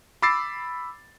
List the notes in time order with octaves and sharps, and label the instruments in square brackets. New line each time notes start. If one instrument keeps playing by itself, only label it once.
[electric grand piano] B5 D6 E6 A6 C7